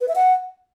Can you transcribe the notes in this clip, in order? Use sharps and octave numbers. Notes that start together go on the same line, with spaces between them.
B4
E5
F#5